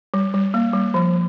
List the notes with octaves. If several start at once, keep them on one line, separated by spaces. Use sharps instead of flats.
G3
G3
A#3
G3
F3